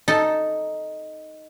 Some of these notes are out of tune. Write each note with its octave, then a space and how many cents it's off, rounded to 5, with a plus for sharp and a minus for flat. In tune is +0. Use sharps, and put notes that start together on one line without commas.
D#4 +0 A4 +0